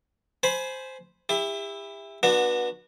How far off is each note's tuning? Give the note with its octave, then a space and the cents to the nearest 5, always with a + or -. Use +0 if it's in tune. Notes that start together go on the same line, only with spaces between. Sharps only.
C5 +0 G#5 +20 B5 +0
E4 +0 G4 +40
B3 -25 D4 +20 F#4 -10